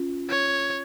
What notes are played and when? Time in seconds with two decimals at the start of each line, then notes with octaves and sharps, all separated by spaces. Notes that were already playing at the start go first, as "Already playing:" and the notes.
Already playing: C#4 F4
0.30 C#5